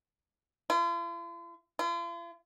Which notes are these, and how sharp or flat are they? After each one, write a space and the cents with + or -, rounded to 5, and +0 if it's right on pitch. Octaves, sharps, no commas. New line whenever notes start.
F4 -45
F4 -45